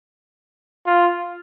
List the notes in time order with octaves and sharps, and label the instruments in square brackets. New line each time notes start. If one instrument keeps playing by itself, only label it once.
[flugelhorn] F4